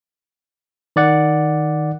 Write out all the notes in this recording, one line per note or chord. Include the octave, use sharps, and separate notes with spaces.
D#3 D5 F#5